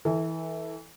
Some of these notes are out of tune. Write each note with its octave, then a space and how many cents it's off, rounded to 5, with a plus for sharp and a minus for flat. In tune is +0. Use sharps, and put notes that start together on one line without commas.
E3 -20 A4 +0